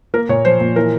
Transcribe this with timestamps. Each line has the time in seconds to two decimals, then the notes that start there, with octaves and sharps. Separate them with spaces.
0.14 A#3 A#4
0.29 A#2 C#5
0.45 F3 C5
0.61 A#2
0.76 E3 A#4